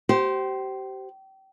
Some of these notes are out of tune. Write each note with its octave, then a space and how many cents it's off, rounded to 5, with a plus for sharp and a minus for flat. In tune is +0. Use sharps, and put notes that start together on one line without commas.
G4 -30 C5 +0